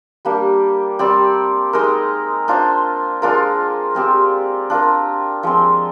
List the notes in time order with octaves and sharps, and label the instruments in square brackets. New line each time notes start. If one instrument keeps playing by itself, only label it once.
[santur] G3 A#3 D4 G4
G3 C4 G4 D5
G#3 D#4 A#4
D4 F4 C5
G#3 D4 F4 A#4
G#3 C4 G4
D4 F4 A#4
F3 G#3 C4